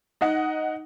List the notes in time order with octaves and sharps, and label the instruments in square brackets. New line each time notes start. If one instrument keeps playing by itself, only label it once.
[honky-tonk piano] D#4 D#5 F#5